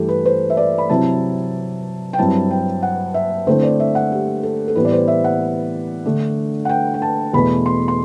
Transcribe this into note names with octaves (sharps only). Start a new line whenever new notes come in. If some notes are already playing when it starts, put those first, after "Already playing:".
Already playing: G2 E3 A3 G4 A4
B4
C5
E5
D5
B5
C3 F#3 C4 E4 A5
G5
G2 F#3 C4 E4 A5
G5
F#5
E5
D3 A3 C4 E4 C5
D5
E5
F#5
G4
A4
A4
A2 E3 G3 B3 B4
D5
C5
E5
F#5
D3 A3 D4
F#5
G5
G5
A5
E2 B2 A3 B5
C6
C6